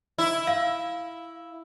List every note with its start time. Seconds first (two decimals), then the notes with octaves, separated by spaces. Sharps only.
0.18 E4
0.47 F5